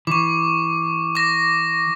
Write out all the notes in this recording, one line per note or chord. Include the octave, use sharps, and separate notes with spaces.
E3 C#6 D6
D6 A#6